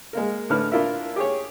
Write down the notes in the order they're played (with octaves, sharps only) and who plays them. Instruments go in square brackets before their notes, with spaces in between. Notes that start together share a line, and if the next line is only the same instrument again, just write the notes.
[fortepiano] G#3 A#3 A#4
A2 D3 D4 E4 B4 F6
D4 E4 F4 A#4 E5
G4 G#4 C#5